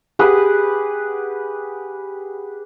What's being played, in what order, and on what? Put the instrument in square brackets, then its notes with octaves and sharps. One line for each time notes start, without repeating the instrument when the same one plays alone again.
[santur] G4 G#4 B4 F#5